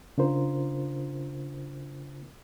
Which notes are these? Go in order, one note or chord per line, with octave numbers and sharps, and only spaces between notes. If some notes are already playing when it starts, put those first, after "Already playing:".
C#3 D4 F4 A#4 C5